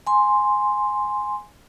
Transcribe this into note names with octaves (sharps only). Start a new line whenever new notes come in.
G#5 C6